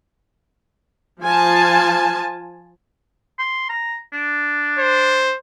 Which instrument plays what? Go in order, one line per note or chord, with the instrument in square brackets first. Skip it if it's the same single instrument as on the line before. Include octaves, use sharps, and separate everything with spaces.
[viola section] F3 G#5 A5
[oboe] C6
A#5
D4
[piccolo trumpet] C5